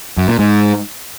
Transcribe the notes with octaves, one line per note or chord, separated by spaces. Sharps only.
F#2
A#2
G#2